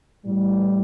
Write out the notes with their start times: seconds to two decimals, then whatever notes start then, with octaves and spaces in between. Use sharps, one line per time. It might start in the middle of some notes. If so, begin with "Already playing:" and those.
0.25 A2 E3 G3